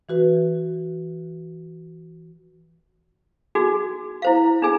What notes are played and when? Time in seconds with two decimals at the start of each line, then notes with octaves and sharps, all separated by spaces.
0.09 E3 F#4 B4
3.55 D#4 F#4 G#4
4.22 E4 C5 F5
4.62 D4 D#4 G#4 G#5